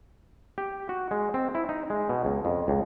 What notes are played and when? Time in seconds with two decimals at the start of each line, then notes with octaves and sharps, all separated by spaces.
0.58 G4
0.89 F#4
1.11 G#3
1.34 C4
1.55 E4
1.69 D#4
1.90 G#3
2.09 B2
2.25 C#2
2.45 F2
2.68 C#2